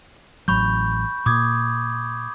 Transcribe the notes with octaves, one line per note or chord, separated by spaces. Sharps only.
A1 F#3 B5 C#6 G6
A#2 D6 D#6 G#6